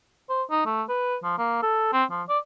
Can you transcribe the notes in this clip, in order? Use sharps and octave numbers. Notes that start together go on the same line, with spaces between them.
C5
D#4
A3
B4
F3
A#3
A4
C4
F3
D5